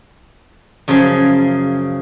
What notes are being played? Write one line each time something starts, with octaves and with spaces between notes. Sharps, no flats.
F#2 C#3 F3 G#4